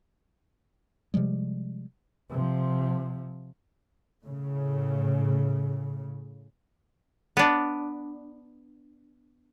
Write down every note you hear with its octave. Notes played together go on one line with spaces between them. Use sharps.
C3 F3 G3 G#3
C3 F3
A2 C#3
B3 D4